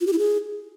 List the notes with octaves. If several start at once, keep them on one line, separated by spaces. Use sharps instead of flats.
F4
G4
E4
G#4